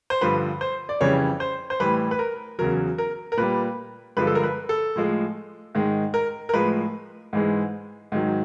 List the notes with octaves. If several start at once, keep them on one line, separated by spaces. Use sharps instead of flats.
C5
G2 D3 F3 B4
C5
D5
F2 C#3 E3 G3 C#5
C5
C5
A2 E3 G3 B4
B4
A#4
E2 C#3 F#3 A#4
A#4
A#4
A#2 G3 B4
G2 D3 F3 G#3 B4
A4
A#4
B4
A4
A2 F3 G#3
G#2 D#3 G#3
A#4
A#4
A2 F3 G#3 B4
G#2 E3 G#3
G#2 D#3 F#3